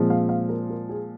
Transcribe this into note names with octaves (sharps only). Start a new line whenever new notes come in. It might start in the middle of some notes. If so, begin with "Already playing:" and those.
Already playing: A#2 F3 G#3 C4
F5
F5
A#4
A#4
G#4